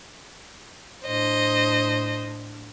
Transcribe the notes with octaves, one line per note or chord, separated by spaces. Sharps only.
A2 D4 C5 D#5